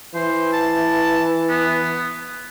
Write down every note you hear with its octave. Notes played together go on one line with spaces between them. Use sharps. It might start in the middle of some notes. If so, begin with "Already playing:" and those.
E3 C5
A5
B3